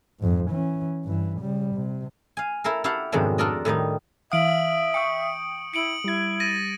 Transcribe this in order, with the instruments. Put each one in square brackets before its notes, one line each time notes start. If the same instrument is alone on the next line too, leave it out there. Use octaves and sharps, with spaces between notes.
[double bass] F2 G#2
E3 C#4
G2 E3
C#3 G3
C3
[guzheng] F5 G#5
E4 A4 A#4 F5
E4 G4 F5 F#5 A5
F2 G#2 B2 D#3 F#3 D4
D4 F4 A4 A#4 D5 D#5
A2 D#3 G3 D#4
[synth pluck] E3 F5 [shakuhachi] E5 [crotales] D#6 D7 F#7
[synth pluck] G5 C#6 D#6 [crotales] C#7
[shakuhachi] E4 [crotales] C#7 D7 F#7
[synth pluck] G3 G#6 [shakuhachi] E4
[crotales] A6 A#6 D#7